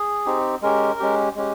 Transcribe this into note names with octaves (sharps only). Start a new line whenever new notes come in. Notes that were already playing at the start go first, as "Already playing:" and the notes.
Already playing: G#4
C4 D#4 G4
G#3 C#4 G4 A#4
G#3 C#4 G4
G#3 C#4 G4